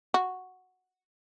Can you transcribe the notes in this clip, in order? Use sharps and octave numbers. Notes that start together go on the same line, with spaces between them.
F#4